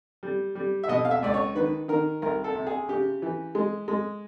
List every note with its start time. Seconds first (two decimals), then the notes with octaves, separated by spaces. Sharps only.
0.23 G3
0.55 G3
0.83 E5
0.89 B2 D#5
1.05 F5
1.11 E5
1.23 C#2 D5
1.34 C#5
1.55 D#3 B4
1.88 D#3 A#4
2.22 C2 A#4
2.44 A4
2.55 C3
2.67 G#4
2.88 C#3 G4
3.22 E3
3.55 G#3
3.88 G#3